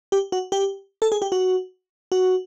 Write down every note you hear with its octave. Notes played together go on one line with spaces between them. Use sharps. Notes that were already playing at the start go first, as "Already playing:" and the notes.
G4
F#4
G4
A4
G#4
G4
F#4
F#4